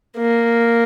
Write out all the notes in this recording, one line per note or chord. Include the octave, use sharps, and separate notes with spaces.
A#3